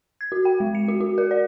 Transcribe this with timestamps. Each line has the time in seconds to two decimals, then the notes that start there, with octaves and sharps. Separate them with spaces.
0.21 G#6
0.32 F#4
0.45 G5
0.60 G#3
0.75 C#7
0.88 F#4
1.01 F#4
1.18 A#4
1.31 D5